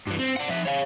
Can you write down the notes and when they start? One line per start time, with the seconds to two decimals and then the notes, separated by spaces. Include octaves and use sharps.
0.07 G2 E3
0.19 C4
0.36 D5 F#5
0.49 F3 E5
0.65 C#5 F5